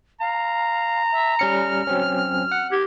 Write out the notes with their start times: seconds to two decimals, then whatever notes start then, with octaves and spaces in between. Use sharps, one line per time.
0.20 F5 A#5
1.12 E5
1.39 G3 C#4 F6 C#7
1.87 F#3 C4 C#4
2.52 F#5
2.72 G4 G#6